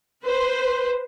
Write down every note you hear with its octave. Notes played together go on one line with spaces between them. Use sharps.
B4 C5